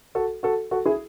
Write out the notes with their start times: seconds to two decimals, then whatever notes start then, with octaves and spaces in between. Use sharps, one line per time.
0.15 F#4 A4
0.43 F#4 A4
0.71 F#4 A4
0.86 E4 G#4